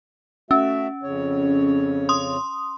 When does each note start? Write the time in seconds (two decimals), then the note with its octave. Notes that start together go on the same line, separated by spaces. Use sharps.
0.51 A3 C#4 F#4 E5
1.03 F2 C#3 C#5
2.09 C6 D#6